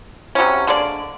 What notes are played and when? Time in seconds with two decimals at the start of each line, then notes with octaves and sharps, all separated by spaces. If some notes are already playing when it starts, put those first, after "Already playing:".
0.35 C3 F#3 G3 C#4
0.67 D3 G#3 A#3 D5